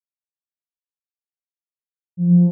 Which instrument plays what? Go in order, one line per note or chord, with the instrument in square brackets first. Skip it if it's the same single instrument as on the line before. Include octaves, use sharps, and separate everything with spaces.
[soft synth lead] F3